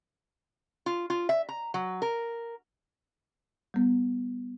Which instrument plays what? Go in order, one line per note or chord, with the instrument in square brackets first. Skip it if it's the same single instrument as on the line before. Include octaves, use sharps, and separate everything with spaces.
[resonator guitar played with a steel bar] F4
F4
E5
A#5
F#3
A#4
[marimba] G3 B3